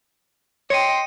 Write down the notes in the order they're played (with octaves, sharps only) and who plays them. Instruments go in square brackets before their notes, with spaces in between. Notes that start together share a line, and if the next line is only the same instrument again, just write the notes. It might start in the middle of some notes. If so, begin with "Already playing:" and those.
[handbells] C#5 [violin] D#5 G5 [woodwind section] C6 [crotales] C#7 D#7